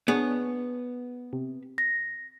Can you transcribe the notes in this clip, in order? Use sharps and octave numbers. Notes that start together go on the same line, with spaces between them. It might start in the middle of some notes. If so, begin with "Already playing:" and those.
B3 D4 G#4 C#5
C3
A#6